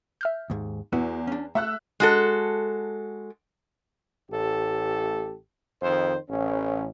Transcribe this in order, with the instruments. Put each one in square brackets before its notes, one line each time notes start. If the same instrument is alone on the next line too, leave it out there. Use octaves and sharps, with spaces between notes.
[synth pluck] E5 F6 G6
[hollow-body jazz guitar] D#2 G#2
[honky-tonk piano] E2 [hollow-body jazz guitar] B3 E4 F#4
[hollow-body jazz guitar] C#4 D4
[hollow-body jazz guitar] A3 F#5 [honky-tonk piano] E5 E6 F#6
[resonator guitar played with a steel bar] G#3 F#4 A4
[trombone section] A1 A2 G4 A4
F2 D#3 C5
A1 C#4